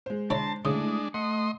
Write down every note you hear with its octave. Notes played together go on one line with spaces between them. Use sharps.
G#3 C5
D4 E4 C#5 D5 A5 A#5 C6
C#3 G#3 A3 D4 E4 D#6
A3 D#5 F#5 C6